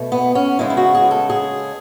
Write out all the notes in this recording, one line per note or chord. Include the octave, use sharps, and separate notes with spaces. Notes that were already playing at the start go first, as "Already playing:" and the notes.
Already playing: B2 A3
B3
C#4
C#3 G#3 B3 E4
E4
F#4
G#4
A4
G#4